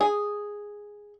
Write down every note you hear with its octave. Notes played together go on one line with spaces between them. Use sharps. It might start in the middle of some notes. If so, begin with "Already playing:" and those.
G#4